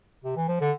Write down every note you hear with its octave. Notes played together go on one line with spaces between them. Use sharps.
C3
E3
F3
D3